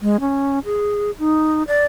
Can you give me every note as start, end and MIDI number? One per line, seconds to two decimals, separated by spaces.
0.01 0.17 56
0.21 0.59 61
0.65 1.11 68
1.19 1.63 63
1.68 1.85 74